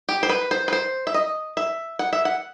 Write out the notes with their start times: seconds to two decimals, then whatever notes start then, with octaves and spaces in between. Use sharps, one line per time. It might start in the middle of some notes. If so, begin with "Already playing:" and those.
0.09 G4
0.23 C5
0.29 B4
0.51 C5
0.68 B4
0.73 C5
1.07 E5
1.14 D#5
1.57 E5
1.99 F#5
2.13 E5
2.25 F#5